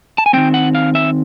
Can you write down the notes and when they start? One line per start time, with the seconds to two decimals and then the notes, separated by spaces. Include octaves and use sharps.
0.18 A5
0.26 G#5
0.33 G3 C4 G5
0.37 D#3
0.54 F#5
0.75 F5
0.95 E5